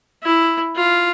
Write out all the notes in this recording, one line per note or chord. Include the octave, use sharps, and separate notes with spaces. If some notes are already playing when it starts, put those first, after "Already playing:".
E4
F4